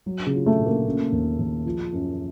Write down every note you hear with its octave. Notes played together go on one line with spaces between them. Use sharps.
F#3
C#3
F4
A3
A#2
A#3
C#3
D#2
D#2
F3
F#2